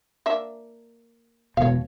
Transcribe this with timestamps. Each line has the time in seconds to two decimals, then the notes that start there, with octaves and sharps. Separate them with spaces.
0.26 A#3 D4 E5
1.57 E1 B2 C#5 F5